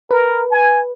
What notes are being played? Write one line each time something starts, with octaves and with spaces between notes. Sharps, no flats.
A#4 B4
G#5